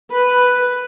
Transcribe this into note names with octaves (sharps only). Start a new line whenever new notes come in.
B4